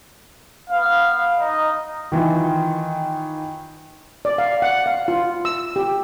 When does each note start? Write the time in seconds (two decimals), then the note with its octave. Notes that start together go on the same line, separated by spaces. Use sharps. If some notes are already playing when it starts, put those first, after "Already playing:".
0.70 B3 F5
1.39 D#4 D#5
2.12 D#3 E3 F4
4.25 D5
4.38 F5
4.62 F#5
4.86 F5
5.08 F4
5.45 E6
5.76 G4